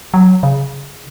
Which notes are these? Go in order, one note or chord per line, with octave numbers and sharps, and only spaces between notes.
F#3
C#3